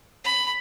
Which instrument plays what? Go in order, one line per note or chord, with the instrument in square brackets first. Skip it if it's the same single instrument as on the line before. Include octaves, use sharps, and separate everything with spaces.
[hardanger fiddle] B5